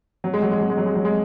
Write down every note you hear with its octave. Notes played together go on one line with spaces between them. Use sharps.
F#3
G#3
F#3
G#3
F#3
G#3
F#3
G#3
F#3
G#3